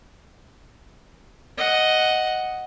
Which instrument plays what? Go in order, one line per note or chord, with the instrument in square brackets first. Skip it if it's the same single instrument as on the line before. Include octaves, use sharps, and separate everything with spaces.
[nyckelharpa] D#5 F#5